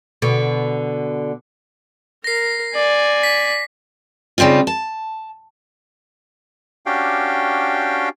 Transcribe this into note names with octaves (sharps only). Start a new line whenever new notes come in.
B2 D3
A#4 A#6 C7
D5 G#5
B6
C#3 G3 C4 D#4 F4
A5
C#4 D4 F#4 G4 F5 G5